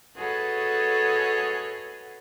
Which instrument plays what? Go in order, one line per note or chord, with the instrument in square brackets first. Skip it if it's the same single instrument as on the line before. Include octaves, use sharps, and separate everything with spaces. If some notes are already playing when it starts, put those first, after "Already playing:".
[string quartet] F#4 G#4 A4 B4 C#5 D#5